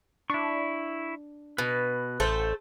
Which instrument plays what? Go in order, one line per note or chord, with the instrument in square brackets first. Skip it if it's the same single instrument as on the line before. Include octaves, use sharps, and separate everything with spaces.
[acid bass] D4 [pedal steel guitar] E4 C#6
[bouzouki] B2 [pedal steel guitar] B4
[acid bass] A1 [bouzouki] A3 A4 C5